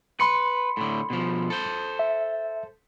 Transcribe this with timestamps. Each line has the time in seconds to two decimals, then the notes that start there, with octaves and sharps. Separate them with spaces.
0.20 B4 B5 C6 C#7
0.77 A2 D3
1.10 B2 F3
1.50 A4 C5
1.99 E5